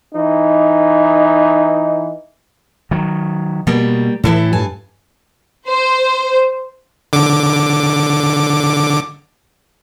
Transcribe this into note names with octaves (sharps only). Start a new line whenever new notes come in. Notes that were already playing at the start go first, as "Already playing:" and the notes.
E3 D#4
D#3 F#3
B2 G3 A#3
A2 E3 E4 A4
G2 G#5 A5
C5
D3 D6